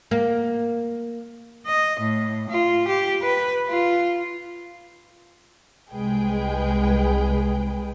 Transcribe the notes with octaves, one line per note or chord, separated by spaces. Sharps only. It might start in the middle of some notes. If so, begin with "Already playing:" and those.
A#3
D#5
A2
F4
G4
B4
F4
C2 G#3 G#4 B4 G5